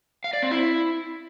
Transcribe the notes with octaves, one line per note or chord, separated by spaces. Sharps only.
F5
D5
C4
E4